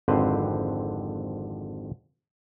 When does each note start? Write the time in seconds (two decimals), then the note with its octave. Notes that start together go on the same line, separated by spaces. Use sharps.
0.08 G#1 F2 D3 C4 B4 C5